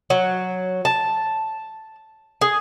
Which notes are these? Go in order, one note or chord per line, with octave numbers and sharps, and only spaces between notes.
F#3
A5
G#4